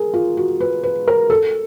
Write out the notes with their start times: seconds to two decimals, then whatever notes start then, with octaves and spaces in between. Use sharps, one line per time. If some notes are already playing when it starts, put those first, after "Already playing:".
Already playing: G#4 A#4
0.14 F4
0.37 F#4
0.60 B4
0.83 B4
1.08 A#4
1.30 A4